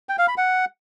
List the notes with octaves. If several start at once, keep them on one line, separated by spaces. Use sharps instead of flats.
G5
F5
B5
F#5